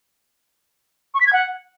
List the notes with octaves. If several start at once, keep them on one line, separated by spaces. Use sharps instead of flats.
C#6
B6
G#6
F#5